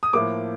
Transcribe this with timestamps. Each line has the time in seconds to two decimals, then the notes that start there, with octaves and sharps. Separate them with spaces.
0.03 D#6
0.13 A2 F3 A#3 D6